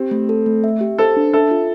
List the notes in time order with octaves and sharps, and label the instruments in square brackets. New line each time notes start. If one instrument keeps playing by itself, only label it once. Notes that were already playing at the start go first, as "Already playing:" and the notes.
Already playing: [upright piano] C4 [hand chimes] G4
[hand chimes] A3
A4
A3
E5
G4
[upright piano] A4 [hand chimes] C5
[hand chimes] D4
[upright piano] A4 [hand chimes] E5
[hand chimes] F4